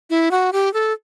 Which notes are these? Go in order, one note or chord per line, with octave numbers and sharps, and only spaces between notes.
E4
F#4
G4
A4